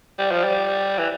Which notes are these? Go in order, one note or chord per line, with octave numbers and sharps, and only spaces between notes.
G3
F3
G3
E3